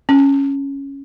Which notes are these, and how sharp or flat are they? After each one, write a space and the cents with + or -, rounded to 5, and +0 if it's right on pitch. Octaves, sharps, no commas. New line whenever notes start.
C#4 -5